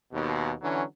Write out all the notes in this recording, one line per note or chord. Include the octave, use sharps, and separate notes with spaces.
D#2 B2
D3 E3 F#3 C#4